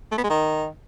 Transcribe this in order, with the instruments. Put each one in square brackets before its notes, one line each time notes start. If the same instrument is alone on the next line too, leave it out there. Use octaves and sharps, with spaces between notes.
[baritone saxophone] A3
B3
G#3
D#3